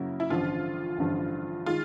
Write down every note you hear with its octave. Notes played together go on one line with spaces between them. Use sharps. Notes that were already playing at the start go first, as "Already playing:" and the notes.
Already playing: F#2 C#3 F#3 A#3 E4
E4
A1 G2 D3 F3 F4
A1 G2 D3 F3
D#3 G#3 F4